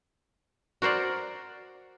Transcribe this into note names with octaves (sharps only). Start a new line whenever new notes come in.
F#4 A#4 C5 D5